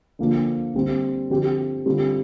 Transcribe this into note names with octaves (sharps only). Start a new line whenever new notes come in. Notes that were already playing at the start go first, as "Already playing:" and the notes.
D3 F3 A#3 D4 F4
D3 G3 C4
D3 F3 C4 G4
D3 G3 C4 F4